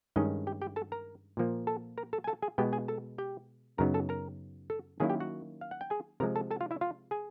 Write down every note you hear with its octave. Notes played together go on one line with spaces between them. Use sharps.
G2 D#3 G#3 C#4 D#4 D#5
G4 G5
G4 G5
A4 A5
A#4 A#5
A#2 F3 A#3
A4 A5
A#4 A#5
A4 A5
G#5
A4 A5
G#4 G#5
B2 G#3 B3 G4 G5
G#4 G#5
A4 A5
G4 G5
F#2 C#3 F#3 B3 D#4 A#4 A#5
A4 A5
A#4 A#5
A4 A5
D#3 F#3 A#3 C#4 E4 G#4 G#5
G4 G5
F#4 F#5
F5
F#5
G5
G#4 G#5
C3 F3 G#3 A#4 A#5
A4 A5
A4 A5
F4 F5
E4 E5
F4 F5
G#4 G#5